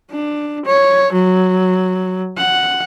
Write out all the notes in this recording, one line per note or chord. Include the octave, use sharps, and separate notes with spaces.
D4
C#5
F#3
F#5